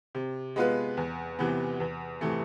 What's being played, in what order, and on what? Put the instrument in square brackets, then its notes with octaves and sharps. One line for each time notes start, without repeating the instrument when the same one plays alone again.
[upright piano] C3
G#3 B3 F4 B4
E2
C3 E3 B3
E2
C3 E3 A3